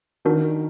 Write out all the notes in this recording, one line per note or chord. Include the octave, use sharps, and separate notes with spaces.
D#3 D4 F#4 A#4